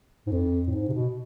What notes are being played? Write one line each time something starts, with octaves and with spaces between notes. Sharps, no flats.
G#2
F2
A2
G#2
C3
B2